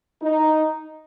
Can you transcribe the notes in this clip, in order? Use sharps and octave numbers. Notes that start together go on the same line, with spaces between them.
D#4